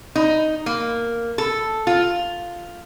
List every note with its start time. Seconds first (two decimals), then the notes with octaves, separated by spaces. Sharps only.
0.15 D#4
0.66 A#3
1.38 A4
1.87 F4